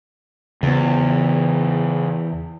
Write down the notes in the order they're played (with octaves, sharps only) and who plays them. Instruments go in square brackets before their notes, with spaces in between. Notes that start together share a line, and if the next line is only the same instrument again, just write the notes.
[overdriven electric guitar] E2 [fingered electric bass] C#3 B3